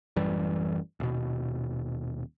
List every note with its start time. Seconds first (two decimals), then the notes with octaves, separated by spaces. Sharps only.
0.16 A1 F#2 E3 G3
1.00 D#1 B2